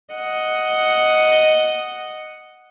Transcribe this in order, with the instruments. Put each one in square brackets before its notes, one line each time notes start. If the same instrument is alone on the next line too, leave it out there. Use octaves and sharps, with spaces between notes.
[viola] D#5 F#5